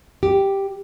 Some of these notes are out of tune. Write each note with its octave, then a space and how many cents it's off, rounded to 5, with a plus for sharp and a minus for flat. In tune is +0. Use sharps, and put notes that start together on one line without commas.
G4 +0